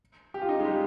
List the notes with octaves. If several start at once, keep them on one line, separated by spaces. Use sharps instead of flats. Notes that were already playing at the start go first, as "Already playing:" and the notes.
G4
F4
D#4
G#3
G3